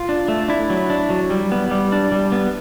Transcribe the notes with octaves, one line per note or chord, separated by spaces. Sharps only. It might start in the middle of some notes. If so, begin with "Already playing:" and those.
Already playing: F4
D4
A3
D4 E4
F#3
D4
F#3
G3
B3
G3
D4
G3
B3